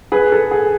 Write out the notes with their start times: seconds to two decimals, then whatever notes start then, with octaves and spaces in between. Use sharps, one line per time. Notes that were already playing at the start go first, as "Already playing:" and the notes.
0.12 G#4 B4
0.32 A4
0.51 G#4